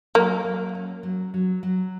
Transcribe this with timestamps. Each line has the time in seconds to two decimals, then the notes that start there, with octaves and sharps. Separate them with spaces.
0.15 F#3 A#3
0.45 F#3
0.75 C#4
1.03 F#3
1.34 F#3
1.63 F#3